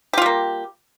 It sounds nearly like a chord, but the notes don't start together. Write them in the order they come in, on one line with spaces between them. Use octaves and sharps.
G4 F4 G3 A#3